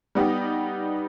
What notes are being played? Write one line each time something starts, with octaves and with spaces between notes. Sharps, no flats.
G3 B3 D#4 G4